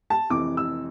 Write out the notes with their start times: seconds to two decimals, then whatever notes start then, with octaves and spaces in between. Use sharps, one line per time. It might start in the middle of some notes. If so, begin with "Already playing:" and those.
0.10 A5
0.30 F1 F2 E3 D6
0.57 E6